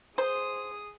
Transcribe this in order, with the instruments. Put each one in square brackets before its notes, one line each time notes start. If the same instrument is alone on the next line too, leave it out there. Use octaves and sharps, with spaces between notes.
[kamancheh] G#4 D#6 [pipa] C5